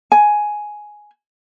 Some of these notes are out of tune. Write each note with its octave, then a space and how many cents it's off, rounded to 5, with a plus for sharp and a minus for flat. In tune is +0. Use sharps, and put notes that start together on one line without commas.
G#5 +10